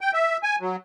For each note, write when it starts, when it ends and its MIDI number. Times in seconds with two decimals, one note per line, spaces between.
0.01 0.11 79
0.14 0.37 76
0.43 0.56 80
0.61 0.76 54